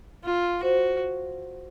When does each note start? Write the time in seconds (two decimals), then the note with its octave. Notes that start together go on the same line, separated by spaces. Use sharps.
0.23 F4
0.63 F#4 C5